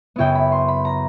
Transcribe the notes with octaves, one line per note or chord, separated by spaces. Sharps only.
F#2 C#3 F#3 B3 E4 G5
B5
C6
B5
A#5